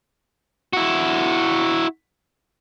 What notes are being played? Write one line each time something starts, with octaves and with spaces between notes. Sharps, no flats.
E4 F#4